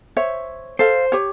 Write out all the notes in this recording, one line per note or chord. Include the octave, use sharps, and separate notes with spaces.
C5 C#5 E5
A4 C5 F5
G4 C#5